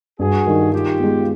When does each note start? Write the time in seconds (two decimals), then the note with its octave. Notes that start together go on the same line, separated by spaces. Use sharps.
0.19 G2 F#4 G#4
0.47 D#3 G3
0.73 D#3 F4 G4
0.99 G#3 B3